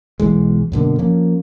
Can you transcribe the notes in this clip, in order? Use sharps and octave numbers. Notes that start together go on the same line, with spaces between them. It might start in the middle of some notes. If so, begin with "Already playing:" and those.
B1 B2 E3 G#3
F#2 B2 D3 A#3
F3 A#3 C#4